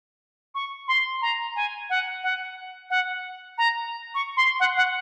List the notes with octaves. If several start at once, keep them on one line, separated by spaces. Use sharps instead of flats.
C#6
C6
A#5
G#5
F#5
F#5
F#5
A#5
C#6
C6
F#5
F#5